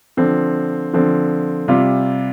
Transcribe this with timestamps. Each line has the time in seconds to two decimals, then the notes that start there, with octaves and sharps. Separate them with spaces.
0.17 D3 F3 C4
0.93 D3 F3 C4
1.68 C3 G3 F4